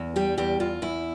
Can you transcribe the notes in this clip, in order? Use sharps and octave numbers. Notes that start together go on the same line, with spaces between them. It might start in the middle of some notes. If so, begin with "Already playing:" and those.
Already playing: E2
G3 G4
E2 G4
E2 F4
E2 E4